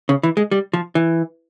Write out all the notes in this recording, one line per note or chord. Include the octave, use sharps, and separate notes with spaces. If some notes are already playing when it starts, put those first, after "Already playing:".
C#3
E3
G#3
G3
F3
E3